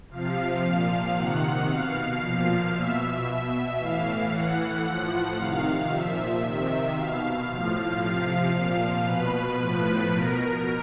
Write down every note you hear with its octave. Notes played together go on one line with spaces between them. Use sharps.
C3 F3 F5
A#2 F3
C3 D#3 F#5
B2 F5
A#2 F3
B2 E5
B2
A2 E3 F5
A2 E3 F#5
A2 F3
C3 D#3 F5
A#2 F3 E5
C3 D#3
B2 F5
A2 F3
C3 F3 F5
A#2 F3
B2 B4
A2 F3
B2 A#4